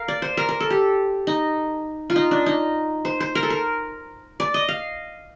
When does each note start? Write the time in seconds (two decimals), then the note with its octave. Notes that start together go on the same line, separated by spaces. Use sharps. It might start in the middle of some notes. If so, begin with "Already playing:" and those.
Already playing: A#4 F5
0.08 D5
0.22 C5
0.37 A#4
0.49 A#4
0.60 A4
0.70 G4
1.27 D#4
2.10 F4
2.16 D#4
2.31 D4
2.46 D#4
3.05 C5
3.20 C5
3.35 A#4
3.43 A4
3.50 A#4
4.40 D5
4.54 D#5
4.69 F5